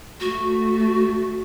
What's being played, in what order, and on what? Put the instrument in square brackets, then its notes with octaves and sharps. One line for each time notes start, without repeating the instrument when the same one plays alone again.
[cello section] A3 [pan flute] F#4